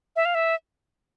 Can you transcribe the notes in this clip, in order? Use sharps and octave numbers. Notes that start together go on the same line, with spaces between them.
E5
F5
E5